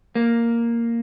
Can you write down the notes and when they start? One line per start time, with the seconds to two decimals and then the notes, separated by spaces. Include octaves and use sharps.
0.15 A#3